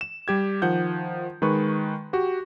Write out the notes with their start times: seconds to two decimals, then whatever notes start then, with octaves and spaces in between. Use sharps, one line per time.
0.01 E7
0.28 G3 G4 G#6
0.62 D#3 F3 F#5 G6
1.42 D#3 G#3 B4 C#6
2.13 F#4 G4